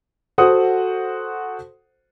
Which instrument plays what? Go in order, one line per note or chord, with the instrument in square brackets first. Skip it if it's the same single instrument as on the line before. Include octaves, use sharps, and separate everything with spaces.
[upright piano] F#4 A4 C5 F#5 D#6